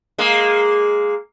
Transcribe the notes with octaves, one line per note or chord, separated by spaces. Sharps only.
G#3 A#3